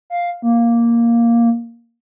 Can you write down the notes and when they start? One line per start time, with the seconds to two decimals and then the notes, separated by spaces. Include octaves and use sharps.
0.10 F5
0.42 A#3